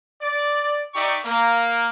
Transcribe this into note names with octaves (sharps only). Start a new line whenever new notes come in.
D5
D#4 G4 D5 E5 C#6
A#3